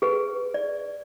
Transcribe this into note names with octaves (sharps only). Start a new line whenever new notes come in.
G#4 B4
D5